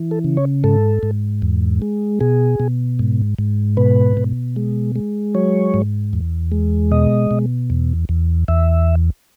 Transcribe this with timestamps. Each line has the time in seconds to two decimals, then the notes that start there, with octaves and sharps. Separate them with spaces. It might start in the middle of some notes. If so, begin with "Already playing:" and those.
Already playing: E3
0.11 A4
0.24 C#3
0.37 C#5
0.64 G#2 A4
1.03 G#2
1.42 E2
1.82 G#3
2.21 B2 G#4
2.60 B2
2.99 G#2
3.39 G#2
3.77 B2 B4
4.17 B2
4.56 G#3
4.96 G#3
5.35 F#3 C#5
5.74 G#2
6.13 E2
6.52 G#3
6.92 B2 D#5
7.31 B2
7.70 E2
8.09 E2
8.48 E2 E5